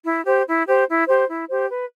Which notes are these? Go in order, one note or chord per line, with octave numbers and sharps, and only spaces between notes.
E4
G4 C5
E4
G4 C5
E4
G4 C5
E4
G4 C5
B4